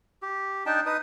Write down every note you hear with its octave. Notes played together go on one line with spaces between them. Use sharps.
G4
D4 D#4 G5 A5
D#4 B4 D#6